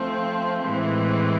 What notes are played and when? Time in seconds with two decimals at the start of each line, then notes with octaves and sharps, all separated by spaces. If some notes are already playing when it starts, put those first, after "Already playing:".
Already playing: F3 A3 C4
0.65 A2 E3 G#3 C4